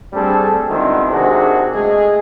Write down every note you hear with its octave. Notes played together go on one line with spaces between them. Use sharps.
G3 A3 C4 D4 G#4 A4
B2 D3 D#3 G#3 C4 E4
C3 D#3 D4 F#4 G#4
G#3 A3 G#4